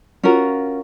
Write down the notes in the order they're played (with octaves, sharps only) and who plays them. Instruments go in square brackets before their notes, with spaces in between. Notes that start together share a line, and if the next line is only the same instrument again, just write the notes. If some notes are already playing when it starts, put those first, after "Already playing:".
[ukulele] C#4 F4 F#4 A#4